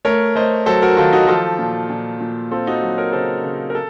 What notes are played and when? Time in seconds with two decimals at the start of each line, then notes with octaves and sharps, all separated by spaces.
0.05 A3 A#4 C#5
0.35 A3 C5 D#5
0.66 F#3 A4 C5
0.82 F#4 A#4
0.97 D#3 F4 A4
1.13 D#4 F#4
1.28 F3 F4 A4
1.59 A#2
1.90 A#2
2.21 A#2
2.51 C4 F4 A4
2.67 D#4 F#4
2.82 F#3
2.98 A#4 C#5
3.12 C#3 A4 C5
3.43 C#3
3.70 A#4
3.75 A4